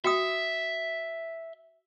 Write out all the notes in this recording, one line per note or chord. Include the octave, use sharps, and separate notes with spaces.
F#4 E5 G5 D#6